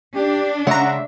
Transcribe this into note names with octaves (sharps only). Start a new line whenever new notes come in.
D4 G4
C#3 G#3 C#5 E5 F#5 A#5